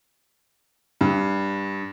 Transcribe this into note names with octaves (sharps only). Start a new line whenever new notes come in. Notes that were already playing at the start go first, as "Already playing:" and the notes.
G2